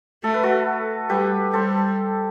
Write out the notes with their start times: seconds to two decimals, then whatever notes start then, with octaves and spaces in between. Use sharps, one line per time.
0.23 A3 A4
0.34 B4
0.43 F#4 A4
1.10 G3 G4 B4
1.53 G3 A4 C5